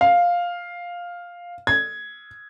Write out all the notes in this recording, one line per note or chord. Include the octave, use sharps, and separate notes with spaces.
F5
G#6